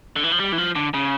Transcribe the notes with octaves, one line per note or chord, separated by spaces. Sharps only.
D3
E3
F3
G3
E3
F3
D3
C#3